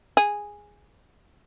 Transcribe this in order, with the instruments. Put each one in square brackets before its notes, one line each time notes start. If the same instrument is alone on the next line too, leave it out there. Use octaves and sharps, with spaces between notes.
[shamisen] G#4